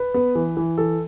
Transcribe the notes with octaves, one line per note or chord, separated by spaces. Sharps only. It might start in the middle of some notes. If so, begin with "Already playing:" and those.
Already playing: B4
B3
E3
E3
E3 A4